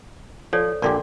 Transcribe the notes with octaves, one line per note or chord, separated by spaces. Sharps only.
F3 A4 C#5 D5
A#1 D3 G4 A#4 D5 C6